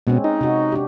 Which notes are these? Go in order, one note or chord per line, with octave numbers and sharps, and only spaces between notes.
B2 G#3 C4 C#4
D#4
C3 F#4
D4 G4